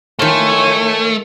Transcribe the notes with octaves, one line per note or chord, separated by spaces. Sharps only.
D#3 A3 F4 C#5 G#5